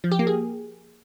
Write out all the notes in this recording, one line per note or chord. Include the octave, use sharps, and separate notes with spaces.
F3
G4
A#3
G#4